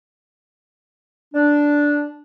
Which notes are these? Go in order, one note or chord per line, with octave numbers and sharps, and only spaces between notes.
D4